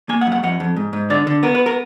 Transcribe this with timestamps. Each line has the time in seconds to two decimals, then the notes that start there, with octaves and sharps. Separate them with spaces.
0.09 A#3 G#5
0.21 F#5
0.27 F#2
0.32 F#5
0.43 F2 F#5
0.60 F2
0.76 G#2
0.93 G#2
1.10 D3 D5
1.27 D3
1.43 B3 A#4
1.55 B4
1.66 A#4